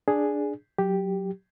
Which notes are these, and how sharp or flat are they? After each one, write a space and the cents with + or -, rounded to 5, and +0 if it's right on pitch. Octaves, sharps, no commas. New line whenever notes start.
D4 +0 G#4 +0
F#3 +0 G4 +0